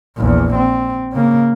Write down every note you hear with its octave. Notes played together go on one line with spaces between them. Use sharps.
A#1 E2
C4
C#3 A#3